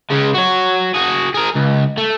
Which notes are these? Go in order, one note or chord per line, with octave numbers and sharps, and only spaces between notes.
C#3 G#3
F#4 C#5
F#4 G#4
G#4 A#4
C#2
A3